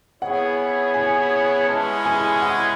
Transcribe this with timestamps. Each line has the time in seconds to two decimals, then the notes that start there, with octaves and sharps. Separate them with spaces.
0.21 B3 E4 G#4 C#5 F#5
0.94 G#5
1.68 G#3 C#4 E4 G#4 B4 A5
2.05 G#5
2.42 F#5